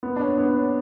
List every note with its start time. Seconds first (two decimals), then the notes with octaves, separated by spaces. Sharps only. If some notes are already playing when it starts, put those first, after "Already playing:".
0.03 B3
0.16 D4
0.21 C#4
0.38 B3
0.55 C#4